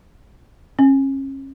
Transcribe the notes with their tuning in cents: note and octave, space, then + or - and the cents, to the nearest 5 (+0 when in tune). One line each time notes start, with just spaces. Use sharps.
C#4 -35